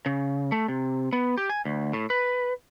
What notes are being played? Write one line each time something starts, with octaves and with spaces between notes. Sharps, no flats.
C#3
A3
C3
B3
G4
G#5
D2
A2
B4